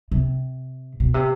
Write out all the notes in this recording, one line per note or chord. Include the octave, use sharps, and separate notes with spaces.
C3
B2
C3